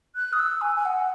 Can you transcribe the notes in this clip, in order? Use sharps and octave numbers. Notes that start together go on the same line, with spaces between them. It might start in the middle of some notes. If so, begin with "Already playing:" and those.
F#6
D#6
E6
G#5
G#5
F#5